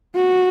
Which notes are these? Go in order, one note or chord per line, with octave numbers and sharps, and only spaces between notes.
F#4